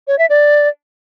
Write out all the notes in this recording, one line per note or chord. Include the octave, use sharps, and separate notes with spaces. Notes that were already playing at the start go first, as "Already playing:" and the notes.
C#5
E5
D5